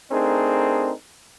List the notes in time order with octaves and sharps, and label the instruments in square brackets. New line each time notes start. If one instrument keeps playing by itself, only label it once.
[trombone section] A3 C4 D4 D#4 G#4 A#4